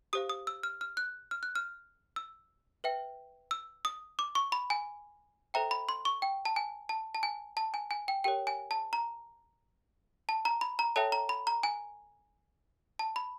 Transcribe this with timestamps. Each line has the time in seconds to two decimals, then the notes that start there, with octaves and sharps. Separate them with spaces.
0.13 G4 C5 F5 D#6
0.30 D#6
0.47 E6
0.63 F6
0.81 F6
0.97 F#6
1.31 F6
1.43 F#6
1.55 F6
2.16 E6
2.84 B4 E5 G5
3.51 E6
3.85 D#6
4.19 D6
4.35 C#6
4.52 B5
4.70 G#5
5.54 A4 C5 E5 G5 A#5
5.71 B5
5.89 C6
6.05 C#6
6.22 G5
6.45 A5
6.56 G#5
6.89 A5
7.15 A5
7.23 G#5
7.57 A5
7.74 G#5
7.91 G#5
8.08 G5
8.24 G4 A#4 C#5 G5
8.47 G#5
8.71 A5
8.93 A#5
10.29 A5
10.45 A#5
10.61 B5
10.79 A#5
10.96 A4 C#5 E5 G5 A5
11.12 A#5
11.29 B5
11.47 A#5
11.63 G#5
12.99 A5
13.16 B5